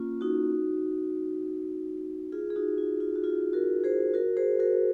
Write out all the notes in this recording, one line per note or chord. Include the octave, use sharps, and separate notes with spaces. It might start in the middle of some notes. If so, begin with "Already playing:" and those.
Already playing: A#3 C#4 F4
D#4 F#4
F4 G#4
G#4
D#4 F#4
F4
F4
F#4
F4 G#4
F#4 A#4
G#4 C5
F#4 A#4
G#4 C5
F#4 A#4